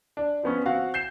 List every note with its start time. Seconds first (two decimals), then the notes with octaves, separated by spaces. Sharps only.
0.17 D4
0.43 F3 B3 C#4
0.66 C4 F#4 F5 F#5
0.94 G6 C7 E7